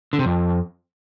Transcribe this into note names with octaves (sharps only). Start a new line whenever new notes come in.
D3
C3
F2